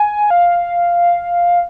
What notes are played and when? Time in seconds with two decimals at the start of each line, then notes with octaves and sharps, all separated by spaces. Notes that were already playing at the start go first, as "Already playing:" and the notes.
Already playing: G#5
0.30 F5